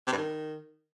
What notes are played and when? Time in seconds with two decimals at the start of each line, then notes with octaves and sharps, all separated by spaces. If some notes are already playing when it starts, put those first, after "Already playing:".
0.07 C3
0.12 G2
0.17 D#3